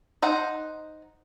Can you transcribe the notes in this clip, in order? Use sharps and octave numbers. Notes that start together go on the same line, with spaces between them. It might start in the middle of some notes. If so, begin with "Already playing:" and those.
D#4 C5 F#5